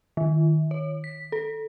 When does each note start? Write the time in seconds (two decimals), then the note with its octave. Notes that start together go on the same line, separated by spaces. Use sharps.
0.17 D#3
0.71 C#5
1.04 B6
1.32 A4